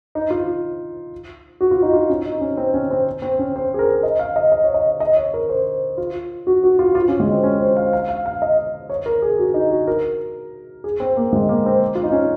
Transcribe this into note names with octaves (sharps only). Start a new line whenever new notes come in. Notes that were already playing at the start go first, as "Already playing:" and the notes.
D#4
F4
F#4
F4
D#4
F4
C#4
D#4
C#4
C4
C#4
C4
C4
C#4
C5
G#4
A#4
D#5
F5
D#5
D#5
C#5
D#5
D#5
C#5
A#4
C5
F4
F#4
F#4
F4
F4
C#4
G#3
C4
C#4
C5
F5
F5
F5
F5
D#5
C#5
A#4
G#4
F#4
D#4
F#4
A#4
G#4
C4
A#3
G#3
A#3
C4
F4
D#4
C#4